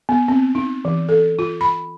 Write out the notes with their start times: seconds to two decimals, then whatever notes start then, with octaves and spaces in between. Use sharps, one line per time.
0.09 B3
0.28 C4
0.55 D#4
0.85 E3
1.09 A4
1.39 F4
1.61 B5